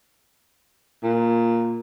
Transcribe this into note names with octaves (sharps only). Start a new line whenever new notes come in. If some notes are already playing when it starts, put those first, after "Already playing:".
A#2